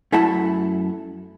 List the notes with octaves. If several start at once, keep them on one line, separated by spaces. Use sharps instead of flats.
F#2 A3 E4 F#5 A5 B5